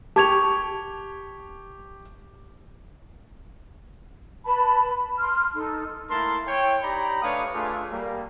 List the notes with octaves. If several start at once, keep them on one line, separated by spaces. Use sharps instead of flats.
G4 A5 C#6 G#6 F7
B4 A5 B5
C6 F6
D#4 A4
A3 A#3 E4 A#4 A5 C6
E4 C#5 G5
D#4 G4 D5 A#5 B5
A3 D4 B4 C#5 F5 D#6
A3 D4 F4 G#4 B4 D6
G3 A#3